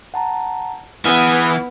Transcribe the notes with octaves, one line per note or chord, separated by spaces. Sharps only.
F#5 A5 A#5
E3 B3 E4 G#4 B4 F6 F#6